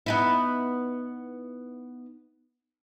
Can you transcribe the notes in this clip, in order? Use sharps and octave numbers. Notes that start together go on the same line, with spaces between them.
B3 D#4 E4